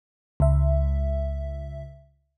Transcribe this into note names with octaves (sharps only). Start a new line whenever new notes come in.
C#2 E5